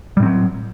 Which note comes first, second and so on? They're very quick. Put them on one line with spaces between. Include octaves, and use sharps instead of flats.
G3 A2 C4 F#3